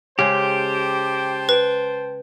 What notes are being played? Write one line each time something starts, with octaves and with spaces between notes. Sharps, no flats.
C#3 G#3 G4 C5 G5 A5
B4